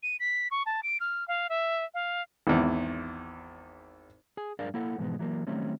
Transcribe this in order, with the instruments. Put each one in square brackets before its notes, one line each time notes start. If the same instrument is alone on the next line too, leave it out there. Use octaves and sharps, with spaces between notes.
[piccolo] D#7
B6
C#6
A5
D7
F6
F5
E5
F5
[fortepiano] G#1 E2
[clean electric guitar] G#4 G#5
G2 D4 G#4 A#4 D5 F5
A#3 E4 A4 F#5
G#2 B2 E3 F3 G#3 B3
E3 F#3 G3 A#3
D#3 F#3 G3 A3 C4 C#4